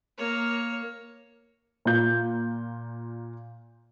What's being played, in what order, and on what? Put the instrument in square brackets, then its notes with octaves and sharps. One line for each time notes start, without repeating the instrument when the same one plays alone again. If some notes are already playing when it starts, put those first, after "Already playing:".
[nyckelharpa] A#3 C#5
[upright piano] A#2 F4 G6